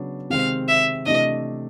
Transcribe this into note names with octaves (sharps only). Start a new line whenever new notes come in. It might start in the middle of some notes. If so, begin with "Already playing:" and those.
Already playing: C#3 F#3 B3 D4
C3 D#3 G#3 C4 F5
E5
C3 E3 A3 D4 D#5